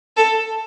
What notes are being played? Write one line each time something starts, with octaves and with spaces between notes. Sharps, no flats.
A4